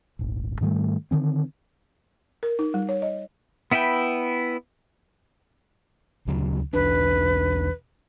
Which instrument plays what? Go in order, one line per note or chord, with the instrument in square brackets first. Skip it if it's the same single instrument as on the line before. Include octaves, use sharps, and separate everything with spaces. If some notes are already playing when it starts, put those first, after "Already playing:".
[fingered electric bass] D#1 G#1
G#2 D#3 G3 A3
D3 D#3 C4
[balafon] A#4
D#4
G3
C#5
D#5
[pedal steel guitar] B3 E4 B4 E5 G5
[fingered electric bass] D2 C#3 F#3
[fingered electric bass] B1 E2 D4 [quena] B4